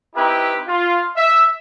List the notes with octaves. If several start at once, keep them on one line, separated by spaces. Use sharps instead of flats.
C4 D#4 E4 G4 B4
F4
E5